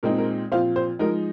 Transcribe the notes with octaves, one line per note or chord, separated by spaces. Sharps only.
A#2 G#3 C4 D#4 A#4
A#4
A#2 F3 C4 F4 C5 F5
C5
F3 G#3 D#4 A#4